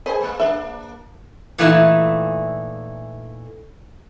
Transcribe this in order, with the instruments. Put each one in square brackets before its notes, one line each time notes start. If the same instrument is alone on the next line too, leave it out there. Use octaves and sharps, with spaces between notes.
[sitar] G#4 C5 [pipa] B4 G#5 [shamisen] D#5
[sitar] G#3 A#3
[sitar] A#3 D4 [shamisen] E5
[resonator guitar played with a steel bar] A#2 E3 A3 D#4 E4